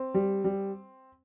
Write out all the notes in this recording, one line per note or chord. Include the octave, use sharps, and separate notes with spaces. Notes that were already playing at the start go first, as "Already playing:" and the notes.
Already playing: C4
G3
G3